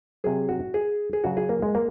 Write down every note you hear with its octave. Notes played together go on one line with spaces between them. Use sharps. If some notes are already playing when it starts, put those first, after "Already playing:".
C3 F#3 G#4
F#4
G#4
G#4
C#3 F#3 F#4
G#4
A#3
G#3
A#3